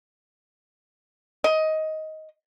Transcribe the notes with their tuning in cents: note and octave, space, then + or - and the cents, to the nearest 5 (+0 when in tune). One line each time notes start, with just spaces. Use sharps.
D#5 +15